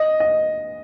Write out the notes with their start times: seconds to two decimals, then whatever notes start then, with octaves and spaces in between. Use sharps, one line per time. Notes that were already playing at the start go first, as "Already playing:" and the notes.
Already playing: D#5
0.20 D#5